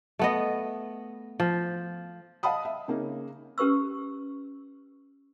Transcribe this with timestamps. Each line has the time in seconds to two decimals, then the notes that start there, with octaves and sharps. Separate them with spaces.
0.19 A3 B3 D#5
1.40 F3
2.43 D#5 F5 F#5 A5 B5 D#6
2.65 E5
2.88 C#3 A#3 C#4 D#4
3.58 C#4 G4 B4 C#6 E6